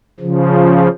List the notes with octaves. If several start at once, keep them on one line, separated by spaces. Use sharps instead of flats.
C#3 F3